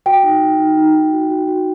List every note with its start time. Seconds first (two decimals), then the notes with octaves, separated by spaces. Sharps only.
0.06 F#4 G5
0.23 D#4
0.41 D#4
0.60 D#4
0.77 D#4
0.95 D#4
1.13 F#4
1.31 F#4
1.48 F#4